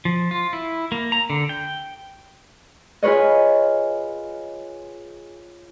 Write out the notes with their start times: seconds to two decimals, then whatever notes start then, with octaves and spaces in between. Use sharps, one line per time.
0.05 F3
0.31 F4
0.53 E4
0.92 A#3
1.12 A#5
1.30 D3
1.49 G5
3.03 F4 G#4 B4 C#5 D#5